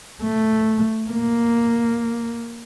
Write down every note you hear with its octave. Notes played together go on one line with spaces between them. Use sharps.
A3
A#3